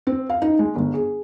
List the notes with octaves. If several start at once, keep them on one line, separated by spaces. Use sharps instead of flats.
C4
F5
D#4
G#3
G1
G#4